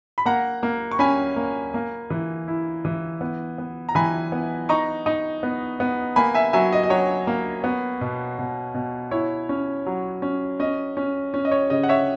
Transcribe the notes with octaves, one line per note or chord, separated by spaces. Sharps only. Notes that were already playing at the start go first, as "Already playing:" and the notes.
B5
A#3 F#5 A#5
A#3
C#6
C#4 G#5 B5
A#3
A#3
E3
E4
E3
B3
B3
A#5
E3 G#5 B5
B3
D#4 A#5 C#6
D#4
B3
B3
A#3 G#5 B5
E5 G#5
F#3 E5 G#5
D#5
D#5
F#3 C#5
A#3
B3
B2
B2
B2
E4 C#5
C#4
F#3
C#4
C#4 D#5
C#4
C#4
D#5
C#5
C#3 D#5
F#5
C#5 E5